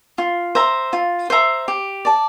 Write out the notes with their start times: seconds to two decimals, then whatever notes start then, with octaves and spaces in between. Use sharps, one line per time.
0.18 F4
0.55 C5 E5 A#5
0.93 F4
1.30 C5 E5 A#5
1.68 G4
2.05 D5 A5